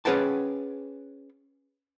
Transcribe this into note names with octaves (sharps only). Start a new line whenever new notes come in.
C#4 G#4 B4 F#5 G5 A5